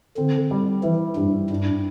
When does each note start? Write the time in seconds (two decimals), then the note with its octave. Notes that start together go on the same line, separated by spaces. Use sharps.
0.17 D3 C4
0.51 G3
0.83 E3 E4
1.16 G2 G3
1.50 G2 D4